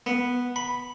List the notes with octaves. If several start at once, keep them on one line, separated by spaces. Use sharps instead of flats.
B3
B5